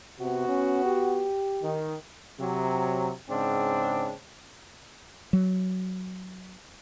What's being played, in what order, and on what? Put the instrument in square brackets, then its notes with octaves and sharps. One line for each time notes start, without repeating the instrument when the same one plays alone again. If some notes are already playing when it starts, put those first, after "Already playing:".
[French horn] C3 [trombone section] B3 F#4
[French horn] C#4
G4
[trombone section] D#3
C3 F#3
G#2 C#3 C4 D4
[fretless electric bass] F#3